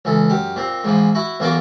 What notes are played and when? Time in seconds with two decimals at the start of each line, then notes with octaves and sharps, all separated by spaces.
0.05 C#2 E3 A4
0.30 F#2 G4
0.56 A#2 C4
0.84 G#2 E3 F3
1.15 E4 F#4
1.40 B1 E3 A#3 F4 F#4 D6